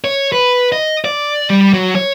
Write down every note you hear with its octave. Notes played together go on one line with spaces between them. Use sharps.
C#5
B4
D#5
D5
G3
F#3
C#5